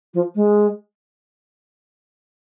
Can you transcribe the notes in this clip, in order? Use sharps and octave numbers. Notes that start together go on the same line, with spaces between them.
F3
G#3